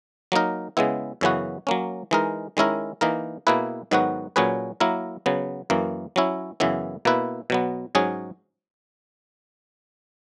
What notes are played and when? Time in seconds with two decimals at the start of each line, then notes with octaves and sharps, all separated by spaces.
0.32 F#3 A#3 D#4 A#4
0.77 C#3 G#3 B3 E4
1.21 F#2 C#3 E3 B3 F#4
1.67 F#3 A#3 C#4
2.11 E3 G#3 D#4 A#4
2.57 D#3 G#3 C#4 E4 A#4
3.01 E3 A#3 D#4 A#4
3.47 B2 A#3 E4 G#4 B4
3.91 G#2 D#3 F#3 B3 F#4
4.36 A#2 F#3 C#4 G#4 B4
4.80 F#3 A#3 E4 A#4
5.26 C#3 F#3 B3
5.70 F#2 E3 A#3
6.16 F#3 C#4 E4
6.60 F#2 C#3 E3 B3 E4
7.05 B2 A#3 E4 B4
7.50 B2 F#3 B3
7.95 G#2 F#3 C#4 G#4